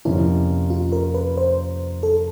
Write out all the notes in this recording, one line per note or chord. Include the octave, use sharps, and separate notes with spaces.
F2 C3 F3 A#3 C#4 E4
F4
A#4
B4
C5
A4